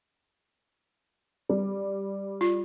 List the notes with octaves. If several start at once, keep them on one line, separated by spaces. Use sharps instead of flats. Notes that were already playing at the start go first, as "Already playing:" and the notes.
G3
F4